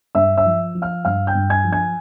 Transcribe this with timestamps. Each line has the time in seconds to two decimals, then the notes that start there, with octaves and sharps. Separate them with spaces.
0.15 G2 E5 E6
0.37 E5 E6
0.45 F3
0.75 F3
0.82 F5 F6
1.05 G2 F5 F6
1.27 G5 G6
1.35 G2
1.50 G#5 G#6
1.64 F3
1.72 G#5 G#6